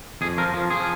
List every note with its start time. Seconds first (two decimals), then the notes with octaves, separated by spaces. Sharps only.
0.21 F2 G#4
0.38 F3 A#4
0.54 F3
0.70 F3 G#4